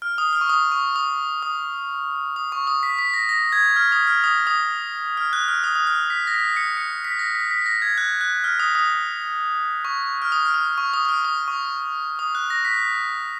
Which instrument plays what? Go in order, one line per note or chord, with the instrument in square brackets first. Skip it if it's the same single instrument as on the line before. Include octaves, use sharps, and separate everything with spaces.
[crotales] F6
D#6
F6
C#6
D#6
C#6
D#6
D#6
D#6
C#6
D#6
B6
B6
A#6
A#6
G#6
F6
D#6
F6
D#6
D#6
F6
F#6
F6
D#6
D#6
F6
B6
A#6
B6
C#7
C#7
B6
A#6
B6
B6
A#6
G#6
F#6
F#6
F6
D#6
D#6
C#6
F6
D#6
F6
D#6
C#6
D#6
D#6
F6
D#6
C#6
D#6
F#6
A#6
B6